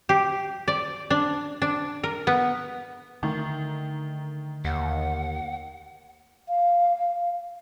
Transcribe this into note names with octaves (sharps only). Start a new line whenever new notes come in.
G4
D5
D4
D4
A#4
B3
D3 D#3 A3
D#2 F#5
F5